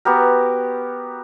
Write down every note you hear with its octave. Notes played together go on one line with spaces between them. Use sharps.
B3 F#4 G4 A#4